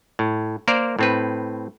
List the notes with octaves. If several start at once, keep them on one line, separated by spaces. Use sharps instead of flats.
A2
A#3 A#4 C5 D5
A2 C4 B4